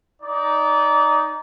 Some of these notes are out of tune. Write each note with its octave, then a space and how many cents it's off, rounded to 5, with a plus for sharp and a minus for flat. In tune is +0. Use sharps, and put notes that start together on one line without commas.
D#4 +0 D5 -25